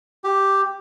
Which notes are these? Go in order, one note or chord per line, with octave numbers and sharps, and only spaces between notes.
G4